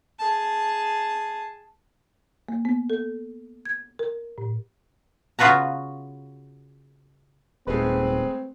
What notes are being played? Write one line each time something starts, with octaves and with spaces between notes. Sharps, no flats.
G#4 A5
A#3
B3
A4
G#6
A#4
A2
C#3 B3 F4 F#4 B4 A#5
D#1 G#3 A3 C4 G#4 B4